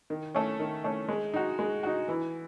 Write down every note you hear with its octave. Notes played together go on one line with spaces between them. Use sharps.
D#3
A3 C#4
D#3
A3 C#4
G#3
D#4 F#4
G#3
D#4 F#4
E3